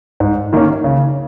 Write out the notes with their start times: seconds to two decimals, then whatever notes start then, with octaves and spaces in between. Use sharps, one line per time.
0.20 G#2
0.53 D#3 A#3 C#4
0.84 C#3